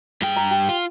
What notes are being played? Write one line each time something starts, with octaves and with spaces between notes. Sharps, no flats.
G2 G#4 G5
A#5
G4
F4